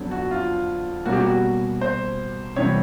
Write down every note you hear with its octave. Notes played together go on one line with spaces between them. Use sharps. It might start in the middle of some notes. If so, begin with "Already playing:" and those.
Already playing: F2 D3 F#3 B3 D4
F#4
F4
B2 G3 A#3 C#4 F#4
G4
F#4
C5
C3 E3 G3 B3 C#5